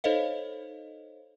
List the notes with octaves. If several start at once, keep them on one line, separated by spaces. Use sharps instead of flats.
D#4 A4 C5 C#5 D#5 F5